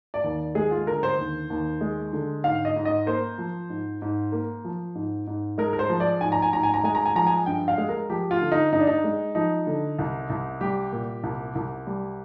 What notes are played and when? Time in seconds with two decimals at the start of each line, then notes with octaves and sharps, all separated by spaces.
0.14 D5
0.24 D#2
0.55 G#3 G#4
0.71 F4
0.86 D3 A#4
1.03 C5
1.18 D#2
1.50 D#2
1.81 G#3
2.13 D3
2.44 G#2 F5
2.65 D#5
2.76 G#2
2.85 D#5
3.06 A#3 C5
3.38 F3
3.70 G#2
4.02 G#2
4.32 A#3
4.65 F3
4.95 G#2
5.27 G#2
5.58 G#3 A#4
5.73 A#4
5.79 C5
5.89 F3
6.00 D5
6.21 G#2 G#5
6.32 A#5
6.42 G#5
6.53 G#2 A#5
6.63 G#5
6.74 A#5
6.83 G#3 G#5
6.95 A#5
7.06 G#5
7.15 F3 A#5
7.27 G#5
7.46 G2 G5
7.68 F5
7.78 G#3
7.89 A#4
8.10 F3 G4
8.31 F4
8.41 D3
8.52 D#4
8.72 G2 D#4
8.80 D4
8.87 D#4
9.04 G#3
9.35 F3 D#4
9.67 D3
9.99 C2
10.30 C2
10.61 G3 G4
10.93 A#2
11.23 C2
11.55 C2
11.87 G3